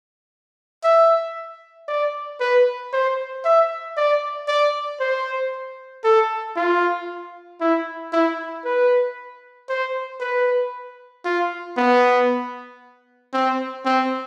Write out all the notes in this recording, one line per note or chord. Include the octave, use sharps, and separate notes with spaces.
E5
D5
B4
C5
E5
D5
D5
C5
A4
F4
E4
E4
B4
C5
B4
F4
B3
C4
C4